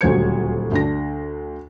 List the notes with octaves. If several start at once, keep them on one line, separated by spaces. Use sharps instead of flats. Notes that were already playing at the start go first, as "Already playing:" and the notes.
D#1 D2 F#3 C5 G#6 C#7
D2 D4 A#6